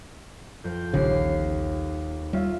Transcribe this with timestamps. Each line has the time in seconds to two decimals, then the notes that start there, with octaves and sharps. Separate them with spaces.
0.64 F2 G6
0.93 D#1 A#1 D#2 C#3 C7
2.33 G3 C#4 F4 E5